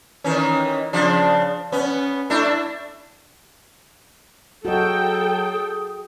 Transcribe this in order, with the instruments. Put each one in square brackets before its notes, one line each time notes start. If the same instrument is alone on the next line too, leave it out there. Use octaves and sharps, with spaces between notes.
[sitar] D#3 E3 C#4
C#3 F3 D4
B3 C#4
A3 D4 E4
[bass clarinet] F#3 [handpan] F#4 D#5 [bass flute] G#4 [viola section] A4 G5